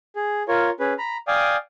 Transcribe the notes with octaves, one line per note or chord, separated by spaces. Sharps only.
G#4
F4 A#4 C#5
C#4 G#4 B4
A#5 B5
D5 F5 G5 G#5 D#6